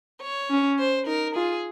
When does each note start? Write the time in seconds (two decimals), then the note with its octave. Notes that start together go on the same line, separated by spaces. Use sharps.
0.22 C#5
0.51 C#4
0.79 C5
1.07 D#4 A#4
1.35 F4 G#4